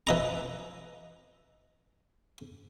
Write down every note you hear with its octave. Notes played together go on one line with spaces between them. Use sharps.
E3 D#5 A#5